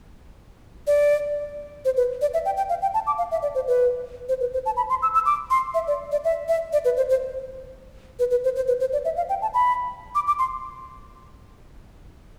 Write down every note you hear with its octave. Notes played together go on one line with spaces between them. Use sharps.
D5
C5
B4
D5
E5
G5
G5
F5
G5
A5
D6
F5
E5
D5
C5
B4
C5
B4
C5
A5
B5
C6
E6
E6
D6
C6
E5
D5
D5
E5
E5
D5
B4
C5
C5
B4
B4
C5
C5
B4
C5
D5
E5
F5
G5
A5
B5
D6
D6
C6